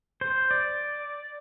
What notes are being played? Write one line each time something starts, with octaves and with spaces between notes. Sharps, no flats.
C5
D5